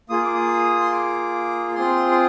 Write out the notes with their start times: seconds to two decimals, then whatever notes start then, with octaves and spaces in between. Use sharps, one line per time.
0.10 A#3 F4 G#4 D#6
0.22 D6
0.34 D#6
0.80 C6
0.92 D6
1.75 C4 F4 G#4 C6
2.11 C6